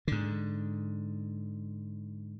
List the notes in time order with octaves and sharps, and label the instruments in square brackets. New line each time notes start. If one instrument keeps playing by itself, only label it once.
[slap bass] G#2 D3